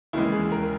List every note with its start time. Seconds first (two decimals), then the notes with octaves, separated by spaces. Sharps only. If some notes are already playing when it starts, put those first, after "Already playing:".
0.13 D#2 C#3 E3 G#3 E4
0.32 G#4
0.52 A#4